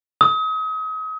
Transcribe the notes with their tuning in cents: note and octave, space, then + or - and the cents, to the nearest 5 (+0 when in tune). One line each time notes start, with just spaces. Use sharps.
D#6 +35